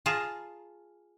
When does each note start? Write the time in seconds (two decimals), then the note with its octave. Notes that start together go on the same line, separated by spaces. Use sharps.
0.06 F4 G#4 A5 A#5